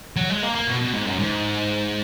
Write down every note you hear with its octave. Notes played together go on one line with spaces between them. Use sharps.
F#3
G#3
A#3
A#3
B2
B2
G#2
F#2
G#2